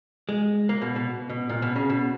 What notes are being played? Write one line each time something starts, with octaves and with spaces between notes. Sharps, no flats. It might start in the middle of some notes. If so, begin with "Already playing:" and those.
G#3
A#3
B2
B2
B2
A#2
B2
C#3
B2